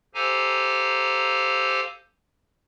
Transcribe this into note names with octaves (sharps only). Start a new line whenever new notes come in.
G4 A4 C5 F5 G#5 A#5